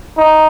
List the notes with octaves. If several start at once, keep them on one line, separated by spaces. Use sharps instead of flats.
D#4